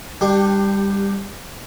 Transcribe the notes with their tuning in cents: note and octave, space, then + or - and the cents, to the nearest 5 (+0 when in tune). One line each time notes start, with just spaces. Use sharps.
G3 +20 D4 +15 G4 +0